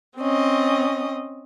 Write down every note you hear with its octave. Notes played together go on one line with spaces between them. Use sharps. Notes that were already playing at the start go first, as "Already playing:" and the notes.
C4 C#4 D#5